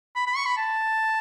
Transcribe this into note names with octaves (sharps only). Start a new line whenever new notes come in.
B5
B5
C#6
B5
A5